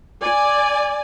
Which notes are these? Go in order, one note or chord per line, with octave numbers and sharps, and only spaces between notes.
D5 G#5